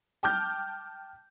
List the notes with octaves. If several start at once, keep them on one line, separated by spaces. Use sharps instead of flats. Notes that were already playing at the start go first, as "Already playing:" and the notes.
G5 A5 D6 F6 G6